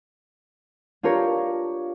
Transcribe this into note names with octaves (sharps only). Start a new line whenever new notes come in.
D4 F4 G4 A#4 C#5